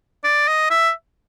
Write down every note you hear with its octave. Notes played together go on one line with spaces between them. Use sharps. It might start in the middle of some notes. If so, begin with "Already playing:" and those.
D5
D#5
E5